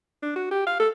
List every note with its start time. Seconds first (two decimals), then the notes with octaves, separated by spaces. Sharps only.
0.22 D4
0.36 F#4
0.51 G4
0.66 F5
0.80 A4